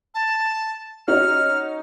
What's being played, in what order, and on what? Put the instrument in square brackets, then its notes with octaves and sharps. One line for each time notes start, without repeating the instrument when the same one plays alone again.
[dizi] A5
[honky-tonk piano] C#4 D#4 F#4 [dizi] F6